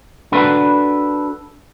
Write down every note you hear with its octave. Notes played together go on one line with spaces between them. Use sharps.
D4 F#4 A4 B4